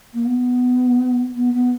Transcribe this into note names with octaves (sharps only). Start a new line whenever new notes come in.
A#3
B3
B3
B3